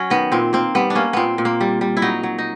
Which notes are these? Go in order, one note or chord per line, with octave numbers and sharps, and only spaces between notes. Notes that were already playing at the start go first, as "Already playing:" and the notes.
Already playing: F#3 C#4
D#3 B3
A#2 C4
A#3 C4
G3 B3
D4
A#3 C#4
A#2 B3 C4
A#2
A#3
G3
G3
E4
F#3 D#4
F#3
D#4